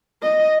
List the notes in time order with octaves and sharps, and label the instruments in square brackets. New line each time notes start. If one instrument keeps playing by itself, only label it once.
[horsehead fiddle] D#5